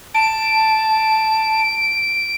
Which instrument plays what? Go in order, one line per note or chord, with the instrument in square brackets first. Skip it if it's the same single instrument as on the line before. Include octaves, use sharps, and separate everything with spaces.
[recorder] A5 [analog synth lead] D7